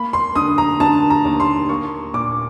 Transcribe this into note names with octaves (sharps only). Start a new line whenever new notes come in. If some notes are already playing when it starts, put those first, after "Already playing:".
Already playing: A#3 B5
C6
D3 D#6
A#5
D3 A5
A#5
D#2
C6
A#3 C#6
A#2 D6